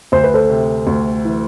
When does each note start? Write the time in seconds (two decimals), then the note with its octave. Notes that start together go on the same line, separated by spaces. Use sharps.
0.12 D2 C5
0.24 B4
0.34 A4 C5
0.50 C3
0.87 D2
1.25 E3